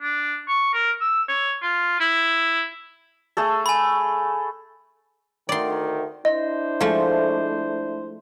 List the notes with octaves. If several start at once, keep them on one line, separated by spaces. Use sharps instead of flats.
D4
C#6
A#4
E6
C#5
F4
E4
A3 G#4 A4
G#5 B5
D2 D#3 D5 C6
D4 E4 C5 D#5
F3 G#3 A3